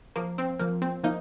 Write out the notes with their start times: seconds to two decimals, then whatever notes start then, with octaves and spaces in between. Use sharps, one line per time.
0.16 F3 A#3
0.38 C4
0.59 F3 A#3
0.82 C4
1.04 F3 A#3 D#4